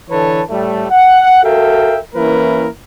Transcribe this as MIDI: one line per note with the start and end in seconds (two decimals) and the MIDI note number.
0.10 0.42 50
0.10 0.42 52
0.10 0.42 69
0.10 0.42 71
0.10 0.42 73
0.10 0.42 81
0.49 0.86 45
0.49 0.86 55
0.49 0.86 57
0.91 1.42 78
1.43 1.99 66
1.43 1.99 69
1.43 1.99 70
1.43 1.99 76
1.43 1.99 77
1.43 1.99 79
2.15 2.68 52
2.15 2.68 58
2.15 2.68 61
2.15 2.68 64
2.15 2.68 70
2.15 2.68 71